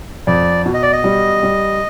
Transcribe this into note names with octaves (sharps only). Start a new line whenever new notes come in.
F2 D5
B2
D#5
D5
D#5
G3
G3